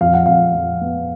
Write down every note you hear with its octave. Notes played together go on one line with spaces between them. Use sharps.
F2 F5
F#5
F2 F5
F2
B3